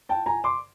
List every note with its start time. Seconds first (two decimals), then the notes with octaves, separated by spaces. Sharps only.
0.09 G5 A5
0.26 G#5 A#5
0.44 C6 D6